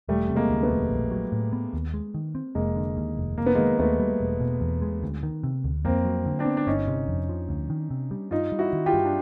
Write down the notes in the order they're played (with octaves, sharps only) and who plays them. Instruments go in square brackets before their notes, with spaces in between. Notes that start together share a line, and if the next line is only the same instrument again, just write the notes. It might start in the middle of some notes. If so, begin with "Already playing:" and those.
[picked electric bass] E1 [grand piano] G3 A3
[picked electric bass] C3
[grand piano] G#3 A#3
[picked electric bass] D2
[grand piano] A3 B3
[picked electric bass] E1
A#1
F#3
A2
B3
D#2
G#3
D#3
C4
[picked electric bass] F1 [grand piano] G#3 A#3
[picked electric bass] D3
D#2
F1
[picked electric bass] F1 [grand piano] A#3
[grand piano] B3
G#3 A#3
[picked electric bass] D#3
[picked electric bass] D#2 [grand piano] A3 B3
[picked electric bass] G3
E1
B2
E2
G#3
D2
D#3
C3
D2
[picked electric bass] F2 [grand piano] A#3 C4
[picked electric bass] F#3
D3
[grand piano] C4 D4
[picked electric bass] B3
[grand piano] D4
[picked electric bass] G1 [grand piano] C#4 D#4
[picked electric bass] C3
F2
F3
D2
D#3
C3
G3
[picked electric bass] G2 [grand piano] D#4 F4
[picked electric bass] G3
[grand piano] E4 F#4
[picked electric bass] D#3
[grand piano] F4 G4
[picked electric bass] G2
[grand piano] D4